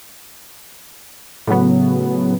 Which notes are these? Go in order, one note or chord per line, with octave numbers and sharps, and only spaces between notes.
A2 C#3 F#3 B3